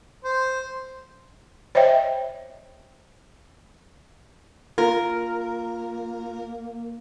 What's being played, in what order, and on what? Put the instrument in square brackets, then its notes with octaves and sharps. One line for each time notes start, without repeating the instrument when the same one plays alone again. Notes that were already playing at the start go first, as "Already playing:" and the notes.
[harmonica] C5
[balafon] C5 C#5 D#5 E5 G5
[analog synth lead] A#3 [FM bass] F4 [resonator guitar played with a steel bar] A#4